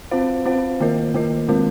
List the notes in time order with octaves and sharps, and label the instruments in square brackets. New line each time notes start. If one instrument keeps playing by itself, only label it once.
[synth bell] C4 F4 C5 F5
C4 F4 C5 F5
D#3 A#3 F4 A#4 D#5
D#3 A#3 F4 A#4 D#5
D#3 G#3 C4 F4 A#4